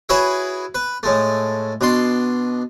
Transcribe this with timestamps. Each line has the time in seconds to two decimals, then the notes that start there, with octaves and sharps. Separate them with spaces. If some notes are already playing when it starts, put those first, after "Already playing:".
0.09 E4 F#4 G#4 B4 C#5 E5
0.75 B4
1.03 A2 G#3 A3
1.81 B2 D4 C6